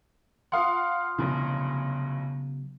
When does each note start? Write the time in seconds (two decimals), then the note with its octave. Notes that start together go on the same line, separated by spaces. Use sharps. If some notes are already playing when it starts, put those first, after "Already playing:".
0.52 F4 F5 F#5 C6 D#6 F6
1.18 F1 B1 C#3 E3 F#3 B3